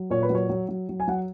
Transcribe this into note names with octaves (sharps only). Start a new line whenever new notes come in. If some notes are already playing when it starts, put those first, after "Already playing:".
Already playing: F#3
A#2 C#5
B4
F#3 C#5
F#3
F#3
F#3
G#5
F#3 F#5